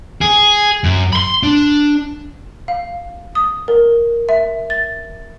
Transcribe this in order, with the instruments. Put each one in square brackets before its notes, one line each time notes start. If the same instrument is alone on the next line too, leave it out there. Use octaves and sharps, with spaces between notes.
[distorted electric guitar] G#4
F#2
B5 C6
D4
[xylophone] F5
D#6
A#4
E5
A6